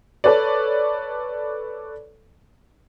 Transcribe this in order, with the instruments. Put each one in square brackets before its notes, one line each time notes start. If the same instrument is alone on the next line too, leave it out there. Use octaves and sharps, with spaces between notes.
[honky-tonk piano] A4 B4 C#5 D5